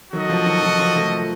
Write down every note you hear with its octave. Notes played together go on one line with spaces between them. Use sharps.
D#3 F#3 F#4 A4 D#5
F3
D#3 F#3
F3
F3
F3 A3